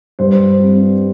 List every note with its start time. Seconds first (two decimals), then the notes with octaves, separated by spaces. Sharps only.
0.19 G2 C5
0.60 G3 C4